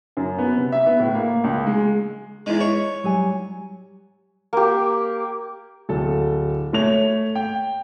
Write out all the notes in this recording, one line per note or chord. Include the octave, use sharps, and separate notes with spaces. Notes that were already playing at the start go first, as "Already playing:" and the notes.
F#2
B3
C3
E5
B3
A2
A#3
C#2
G#3
E2 G#3 D#4
C#5
F#3 G3 G#5
A#3 G4
D1 A4
A3 C#5 F7
G5